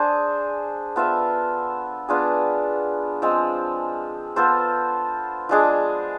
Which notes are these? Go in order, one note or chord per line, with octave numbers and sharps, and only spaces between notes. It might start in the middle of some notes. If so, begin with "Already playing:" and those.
Already playing: D4 G#4 C5
B3 F4 A4 E5
B3 D4 F4 G#4
F3 G#3 C4
B3 F4 A4 C5
F3 G#3 D4 G#4